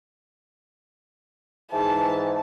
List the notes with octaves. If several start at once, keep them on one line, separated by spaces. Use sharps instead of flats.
G#2 E3 A5